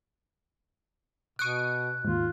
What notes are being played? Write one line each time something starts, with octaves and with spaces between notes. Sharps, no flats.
B2 C#6 D#6 F#6 D7
D#2 G#2 F4